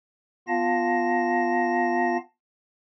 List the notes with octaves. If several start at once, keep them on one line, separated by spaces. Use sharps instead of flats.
B3 F4 F5 A5 A#6